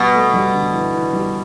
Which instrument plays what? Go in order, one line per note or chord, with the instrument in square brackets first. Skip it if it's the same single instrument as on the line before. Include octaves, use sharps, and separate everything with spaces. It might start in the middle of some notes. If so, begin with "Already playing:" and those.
Already playing: [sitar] B2 [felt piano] G3 B3
[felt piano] A3
G3
D3
E3
E3
G3